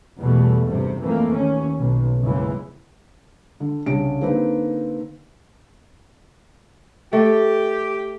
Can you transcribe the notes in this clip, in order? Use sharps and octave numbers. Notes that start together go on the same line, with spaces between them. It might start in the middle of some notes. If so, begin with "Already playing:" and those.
E2 B2 G3 A3
G#1 G2 C3
F2 E3 A3 A#3
D#2 C#4
B1
F#1 C#2 C#3 E3
D3
C2 C#3 C#4 D4 D7
D3 A#3 C4 D#4 B4
A3 G4